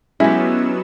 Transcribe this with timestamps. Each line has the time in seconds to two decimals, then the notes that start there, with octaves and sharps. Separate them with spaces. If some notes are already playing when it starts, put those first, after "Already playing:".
0.20 F#3 G#3 B3 C#4 E4 G4 E6